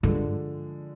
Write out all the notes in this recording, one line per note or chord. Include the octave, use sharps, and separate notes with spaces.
G2 D3 F3 G#3